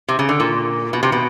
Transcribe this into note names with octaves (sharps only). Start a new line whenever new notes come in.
C3
C#3
D3
A#2
B2
C3
B2